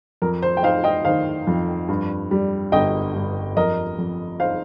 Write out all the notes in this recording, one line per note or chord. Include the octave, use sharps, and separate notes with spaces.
F2 A#4
C5
G5
D#4 C5 F5
D#5 G5
D#3 C5 F5
F2
G2
G3
G1 D#5 G5
G2
F2 A#4 D#5
F2
D#4 C5 F5